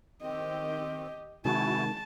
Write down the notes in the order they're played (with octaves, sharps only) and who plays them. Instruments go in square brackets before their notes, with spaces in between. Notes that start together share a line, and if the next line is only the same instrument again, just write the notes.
[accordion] D#3 C4 [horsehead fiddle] G4 D#5
[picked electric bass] C3 D#3 G#3 [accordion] E4 F#4 G#5 [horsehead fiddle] A5